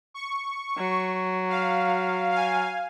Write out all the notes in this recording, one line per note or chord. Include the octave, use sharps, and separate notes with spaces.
C#6
F#3
F5
F5 G#5